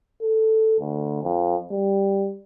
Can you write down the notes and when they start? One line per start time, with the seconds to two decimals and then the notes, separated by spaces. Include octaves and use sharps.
0.22 A4
0.80 D2
1.23 F2
1.71 G3